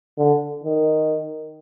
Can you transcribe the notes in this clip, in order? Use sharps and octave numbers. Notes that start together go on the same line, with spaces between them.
D3
D#3